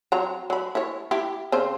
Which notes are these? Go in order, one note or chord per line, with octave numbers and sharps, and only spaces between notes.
F#3 C4 A#5
F#3 B5
E4 C#5
E4 G4
C#3 C4 C5